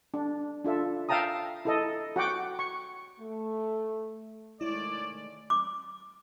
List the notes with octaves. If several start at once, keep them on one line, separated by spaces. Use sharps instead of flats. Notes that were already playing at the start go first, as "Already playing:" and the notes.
D4
D4 F4 A4 E5
E5 F5 G5 A5 A#5 D#6
E4 A4 D#5
F#4 F#5 G5 D6
C#6
A3
D#3 G#3 A3 E4 C#5 D5
D6